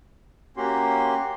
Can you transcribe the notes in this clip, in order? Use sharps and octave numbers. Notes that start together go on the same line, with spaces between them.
A#3 C#4 F#4 G4 C6